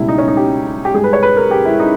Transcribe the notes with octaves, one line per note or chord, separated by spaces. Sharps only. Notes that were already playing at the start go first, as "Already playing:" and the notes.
Already playing: C#2 B2 G3 E4
D#4
C#4
D#4
G4
G4
G#2 G3 G#4
B4
C#5
B4
A#4
G4
E4
D#4